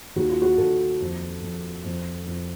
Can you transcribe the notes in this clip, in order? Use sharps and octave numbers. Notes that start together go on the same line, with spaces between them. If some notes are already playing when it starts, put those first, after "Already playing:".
D#2 F#4
F4
F#4
D#2 A4
F2
F2
F2
F2